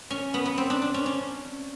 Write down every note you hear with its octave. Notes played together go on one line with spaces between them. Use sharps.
C#4
B3
B3
C4
D4
D4
C#4
C#4